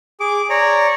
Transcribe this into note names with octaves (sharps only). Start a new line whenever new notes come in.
G#4 D6
C#5 D5 A#5